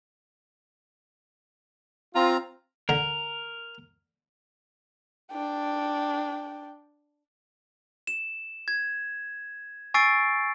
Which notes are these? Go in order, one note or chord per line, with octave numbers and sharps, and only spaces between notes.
C4 F4 A#5
D3 A#4
D4 G5
E7
G#6
G#5 C#6 E6 A6 C7 D7